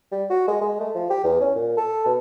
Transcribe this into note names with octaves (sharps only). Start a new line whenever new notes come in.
G3
F#4
G#3
G#3
A3
F3
G4
E2
C#4
A#2
A4
B2